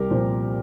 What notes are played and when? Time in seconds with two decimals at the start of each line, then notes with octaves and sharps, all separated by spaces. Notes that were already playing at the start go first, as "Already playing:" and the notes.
Already playing: C2 G4 A#4
0.10 A#2 F3 C4